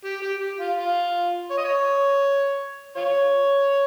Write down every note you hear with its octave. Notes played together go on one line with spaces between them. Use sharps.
G4
G4
G4
F4
F4
C#5
D#5
C#5
F4 C#5